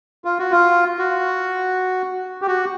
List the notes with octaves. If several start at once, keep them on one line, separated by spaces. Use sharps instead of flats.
F4
F#4
F4
F#4
G4
F#4